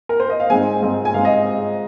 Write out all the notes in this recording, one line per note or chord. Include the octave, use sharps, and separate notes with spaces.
A#4
C5
D#5
F5
G#2 G#3 C4 D#4 G#5
G#2 G#3 C4 D#4
G#5
G#2 G#3 C4 F5
D#5